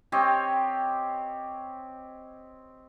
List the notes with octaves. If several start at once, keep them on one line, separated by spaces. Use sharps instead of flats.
C4 G4 C#5 D#5